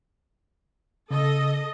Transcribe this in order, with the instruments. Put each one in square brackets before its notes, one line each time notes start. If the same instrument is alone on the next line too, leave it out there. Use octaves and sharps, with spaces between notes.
[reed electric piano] C#3 [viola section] A4 D#5